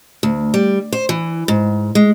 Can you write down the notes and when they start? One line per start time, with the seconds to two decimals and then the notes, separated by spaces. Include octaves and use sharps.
0.23 D2
0.54 G3
0.93 C5
1.09 E3
1.48 G#2
1.95 G#3